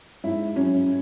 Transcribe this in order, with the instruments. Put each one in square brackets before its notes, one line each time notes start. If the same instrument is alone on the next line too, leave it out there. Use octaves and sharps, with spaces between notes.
[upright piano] G#2 E4
F#3 C#4